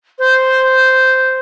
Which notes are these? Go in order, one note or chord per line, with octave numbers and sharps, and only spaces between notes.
C5